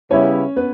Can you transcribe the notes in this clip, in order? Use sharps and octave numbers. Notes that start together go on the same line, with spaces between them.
C#3 G3 B3 C#4 E4 C#5
B3 B4